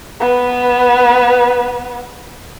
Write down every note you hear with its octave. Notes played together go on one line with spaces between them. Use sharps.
B3 B4